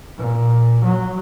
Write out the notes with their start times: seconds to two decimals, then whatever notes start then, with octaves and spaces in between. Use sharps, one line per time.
0.17 A#2
0.84 F#3